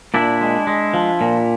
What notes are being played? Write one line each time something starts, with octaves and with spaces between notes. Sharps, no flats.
A#2 D4 E4
G#3
G#3
F3
A#2